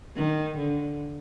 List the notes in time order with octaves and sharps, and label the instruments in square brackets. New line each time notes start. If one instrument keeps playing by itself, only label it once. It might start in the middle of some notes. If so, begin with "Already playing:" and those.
[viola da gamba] D#3
D3